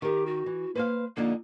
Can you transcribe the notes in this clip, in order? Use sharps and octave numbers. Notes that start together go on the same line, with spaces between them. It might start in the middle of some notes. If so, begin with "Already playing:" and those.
D#3 G4 A#4
F#4
E3
A#3 B4 C5 F5
F2 D3 A#3 D#4